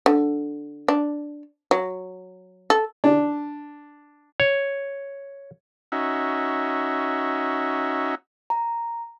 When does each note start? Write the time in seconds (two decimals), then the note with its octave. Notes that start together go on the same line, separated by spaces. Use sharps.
0.06 D3
0.88 D4
1.71 F#3
2.70 A4
3.04 D4
4.40 C#5
5.92 C#4 D#4 F#4 E5
8.50 A#5